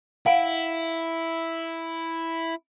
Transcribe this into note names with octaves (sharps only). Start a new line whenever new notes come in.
E4 F5 F#5 G#5